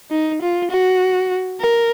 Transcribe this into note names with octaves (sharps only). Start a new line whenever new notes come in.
D#4
F4
F#4
A#4